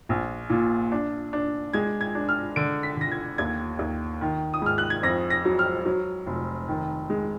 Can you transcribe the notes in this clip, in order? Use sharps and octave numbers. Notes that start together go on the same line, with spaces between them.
A#1
A#2
D4
D4
G#3 G#6
G#6
D4
F6
D3 D7
B6
D3 A#6
G#6
D#2 G#6
D#2
D#3
D#6
G#2 F6
F#6
G#6
F2 A#6
A#6
F#3
F6
F#3
F1
D#3
G#3